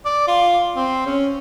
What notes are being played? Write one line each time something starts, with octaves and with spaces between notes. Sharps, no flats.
D5
F4
C4
C#4